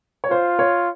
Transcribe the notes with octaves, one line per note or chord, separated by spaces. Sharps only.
C#5
F4 C5
C#5